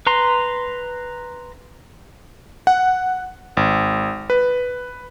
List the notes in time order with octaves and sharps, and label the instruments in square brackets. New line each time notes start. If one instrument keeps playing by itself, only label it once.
[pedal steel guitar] B4 A#5 C6
[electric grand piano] F#5
G#1
B4